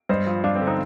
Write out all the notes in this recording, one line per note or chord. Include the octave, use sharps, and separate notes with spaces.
G2 C5 D#5
F3
G2 D4 F4
C4
D3
C4 D#4